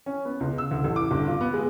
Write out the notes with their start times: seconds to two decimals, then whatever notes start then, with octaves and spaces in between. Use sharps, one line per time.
0.06 C#4
0.25 B3
0.40 C#2
0.58 E6
0.71 D2
0.84 A1
0.96 D6
1.11 G1
1.27 F4
1.41 B3
1.54 G#3